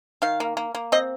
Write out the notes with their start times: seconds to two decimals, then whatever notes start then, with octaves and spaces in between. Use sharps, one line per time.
0.22 D#3 F5
0.40 A#3
0.57 A#3
0.75 A#3
0.92 C4 D#5